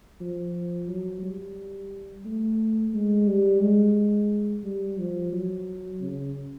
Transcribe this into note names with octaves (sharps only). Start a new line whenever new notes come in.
F3
F#3
G3
A3
G#3
G3
G#3
G3
F3
F#3
C#3